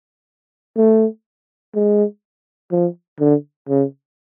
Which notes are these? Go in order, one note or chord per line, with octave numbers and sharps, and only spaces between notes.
A3
G#3
F3
D3
C#3